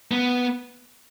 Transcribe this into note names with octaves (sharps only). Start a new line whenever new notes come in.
B3